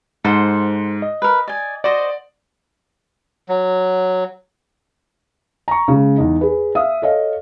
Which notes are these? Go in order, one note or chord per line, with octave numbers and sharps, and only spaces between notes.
G#2 A4 C5 F#5
D#5
A#4 B4
D5 G#5
F#4 C5 D5 D#5
F#3
A#5 C#6
C#3 G#3
E2 D#4
G#4 B4
E5 F5 D#6
A4 C#5 D#5 F5